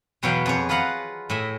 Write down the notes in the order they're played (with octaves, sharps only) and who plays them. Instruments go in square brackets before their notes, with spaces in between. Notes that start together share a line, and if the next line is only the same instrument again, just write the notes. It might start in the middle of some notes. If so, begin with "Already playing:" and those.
[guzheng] E2 B2 F#3 B3 F5 G5
F2 G#4 C#5
F4 B4 D#5 F5 F#5 A#5
A2 D#5 E5 G#5